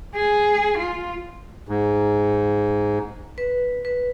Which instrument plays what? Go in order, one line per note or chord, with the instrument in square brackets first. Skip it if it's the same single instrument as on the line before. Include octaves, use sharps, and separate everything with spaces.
[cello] G#4
F4
[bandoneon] G#2
[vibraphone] B4
B4